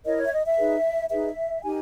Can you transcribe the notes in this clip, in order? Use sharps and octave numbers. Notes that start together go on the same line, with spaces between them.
E4 A#4 C#5 D#5
C#5
E5
D#5
E5
D#4 G#4 B4
D#4 G#4 B4 E5
D#4 G4 A#4 G#5